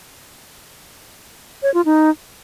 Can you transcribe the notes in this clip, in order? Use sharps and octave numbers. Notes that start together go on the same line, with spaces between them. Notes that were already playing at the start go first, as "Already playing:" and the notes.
C#5
F4
D#4